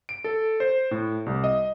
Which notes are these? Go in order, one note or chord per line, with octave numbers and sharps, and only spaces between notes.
D7
A4
C5
A2
C2
D#5